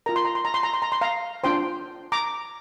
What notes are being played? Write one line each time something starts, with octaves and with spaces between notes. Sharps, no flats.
F4 A#4 A#5
C6
A#5
C6
A#5
C6
A#5
C6
A#5
C6
F5 A#5
D4 F4 C5 G5 C6
A#5 D6